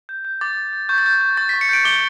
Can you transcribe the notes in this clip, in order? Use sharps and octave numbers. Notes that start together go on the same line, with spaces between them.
G6
G6
D6 A6
D6
G6
C#6 G6
A6
G6
G6
C#6 A6
B6
C#6
C#7
G6 D7
D6 G7